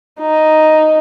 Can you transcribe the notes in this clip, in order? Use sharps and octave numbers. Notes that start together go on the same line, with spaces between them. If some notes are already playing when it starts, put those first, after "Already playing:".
D#4